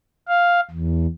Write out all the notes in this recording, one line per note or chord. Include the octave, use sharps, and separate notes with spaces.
F5
E2